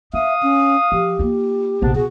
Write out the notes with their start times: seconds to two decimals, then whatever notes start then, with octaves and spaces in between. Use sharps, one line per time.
0.14 D4 E5 F5 D#6
0.43 C#4
0.92 F3 G4
1.19 A#3 F4
1.82 A#1 G#2 C3 B3 D4
1.95 B2 F#4 G#4